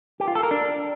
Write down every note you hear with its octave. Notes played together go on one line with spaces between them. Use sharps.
G4
F4
A4
A#4
D4